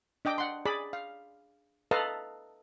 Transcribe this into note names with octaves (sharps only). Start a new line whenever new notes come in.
D4 D#5 G5 D6
F#5 C6
G#4 D5 B5
F5
A4 B4 D#5 F5 A5 A#5